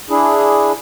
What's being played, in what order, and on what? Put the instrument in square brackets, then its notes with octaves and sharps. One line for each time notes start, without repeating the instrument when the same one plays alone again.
[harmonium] D4 E4 G#4